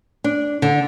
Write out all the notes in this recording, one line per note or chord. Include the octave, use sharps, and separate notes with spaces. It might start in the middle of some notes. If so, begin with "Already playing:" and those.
D4
D3